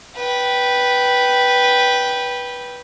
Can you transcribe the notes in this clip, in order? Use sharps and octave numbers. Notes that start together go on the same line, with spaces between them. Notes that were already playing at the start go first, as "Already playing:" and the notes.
B4 G5